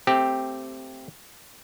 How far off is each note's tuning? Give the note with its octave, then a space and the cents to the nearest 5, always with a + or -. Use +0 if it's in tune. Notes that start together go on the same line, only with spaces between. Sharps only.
A3 +10 C4 +0 G4 +0